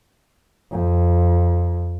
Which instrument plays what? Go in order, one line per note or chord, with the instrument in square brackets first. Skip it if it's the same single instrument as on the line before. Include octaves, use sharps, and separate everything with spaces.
[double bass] F2